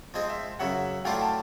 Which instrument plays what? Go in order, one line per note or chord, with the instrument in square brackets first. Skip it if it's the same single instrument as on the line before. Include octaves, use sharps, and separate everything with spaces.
[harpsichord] F3 G#3 C4 [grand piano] D#5
[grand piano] E5
[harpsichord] F#2 C#3 F#3 [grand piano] E5 F#5
[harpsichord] A2 F#3 A3 D4 F4 [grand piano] F5 G5
[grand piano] G5 A5